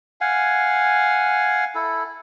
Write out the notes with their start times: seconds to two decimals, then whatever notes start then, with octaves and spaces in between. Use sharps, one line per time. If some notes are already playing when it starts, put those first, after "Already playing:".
0.21 F5 F#5 G#5
1.75 E4 A4